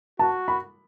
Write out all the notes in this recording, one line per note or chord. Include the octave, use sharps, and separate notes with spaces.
F#4 A5
B5